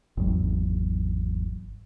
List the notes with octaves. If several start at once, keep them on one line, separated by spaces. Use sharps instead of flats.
G#1 E2 F#3